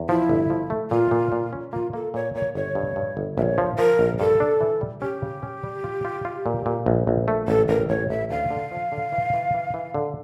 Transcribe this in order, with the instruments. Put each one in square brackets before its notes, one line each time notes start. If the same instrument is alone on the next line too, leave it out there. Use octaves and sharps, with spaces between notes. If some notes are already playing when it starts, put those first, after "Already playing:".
Already playing: [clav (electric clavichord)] E2
[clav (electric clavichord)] F3 [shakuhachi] E4
[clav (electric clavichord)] G1
F3
A3
[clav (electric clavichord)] A#2 [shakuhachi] F4
[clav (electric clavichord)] A#2
A#2
C#4
[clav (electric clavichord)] A#3 [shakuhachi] F4
[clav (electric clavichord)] A#3 [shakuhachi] A4
[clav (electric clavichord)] A#2 [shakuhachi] C#5
[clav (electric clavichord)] A#2 [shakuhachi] C#5
[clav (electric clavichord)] G1 [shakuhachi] C#5
[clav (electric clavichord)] G2
G2
G1
[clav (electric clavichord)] A#1 [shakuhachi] C#5 E5
[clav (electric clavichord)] F3
[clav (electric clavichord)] F3 [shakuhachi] A#4
[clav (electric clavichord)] A#1
[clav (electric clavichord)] G2 [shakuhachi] A4
[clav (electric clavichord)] D4
E3
G3
[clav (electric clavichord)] C#4 [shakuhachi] G4
[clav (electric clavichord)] C#3
C#4
G3
F4
F4
F4
A#2
A#2
A#1
A#1
A3
[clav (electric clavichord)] A1 [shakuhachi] A4
[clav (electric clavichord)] A1 [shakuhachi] A#4
[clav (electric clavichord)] A1 [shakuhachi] C#5
[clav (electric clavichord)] A1 [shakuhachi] E5
[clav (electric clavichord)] D2 [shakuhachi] F5
[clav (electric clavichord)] D3
F3
D3
E3
E3
E3
E3
D3